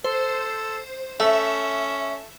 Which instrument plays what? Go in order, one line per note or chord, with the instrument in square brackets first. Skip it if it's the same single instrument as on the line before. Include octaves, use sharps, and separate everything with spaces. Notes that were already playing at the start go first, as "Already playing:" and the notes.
[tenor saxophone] A4 [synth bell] C5
[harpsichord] A3 [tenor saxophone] C#4 [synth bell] E5